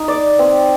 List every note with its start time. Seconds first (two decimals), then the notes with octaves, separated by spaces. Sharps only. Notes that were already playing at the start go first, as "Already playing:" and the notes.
Already playing: D#4
0.08 D5
0.39 C4